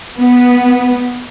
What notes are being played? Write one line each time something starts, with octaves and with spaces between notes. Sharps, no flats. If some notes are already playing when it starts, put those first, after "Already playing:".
B3